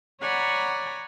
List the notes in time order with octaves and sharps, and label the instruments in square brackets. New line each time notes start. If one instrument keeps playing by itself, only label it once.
[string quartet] C#5 D5 F#5 G#5 A#5 B5